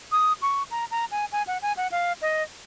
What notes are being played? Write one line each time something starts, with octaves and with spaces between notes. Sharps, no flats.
D#6
C#6
A#5
A#5
G#5
G#5
F#5
G#5
F#5
F5
D#5